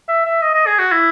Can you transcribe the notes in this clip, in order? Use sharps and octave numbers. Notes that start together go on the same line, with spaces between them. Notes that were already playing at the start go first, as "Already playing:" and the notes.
E5
E5
D#5
D#5
G#4
F#4
E4